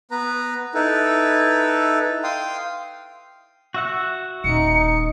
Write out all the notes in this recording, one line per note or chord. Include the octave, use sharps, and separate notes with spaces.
B3 B4 A#5
D#4 E4 A4 B4
F5 G5 C6 D#6
F#4 E5 F#5
D#1 D#4 C#7